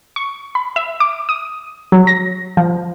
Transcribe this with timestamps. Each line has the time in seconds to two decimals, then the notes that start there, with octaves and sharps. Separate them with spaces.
0.16 C#6
0.55 B5
0.76 E5
1.00 D6
1.29 D#6
1.92 F#3
2.07 A#6
2.57 F3